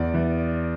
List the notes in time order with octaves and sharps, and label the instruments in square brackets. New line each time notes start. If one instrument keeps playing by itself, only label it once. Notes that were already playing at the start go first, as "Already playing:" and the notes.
Already playing: [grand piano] E2 D5
E3